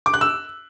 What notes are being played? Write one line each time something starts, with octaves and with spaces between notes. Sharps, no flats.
D6
F#6
E6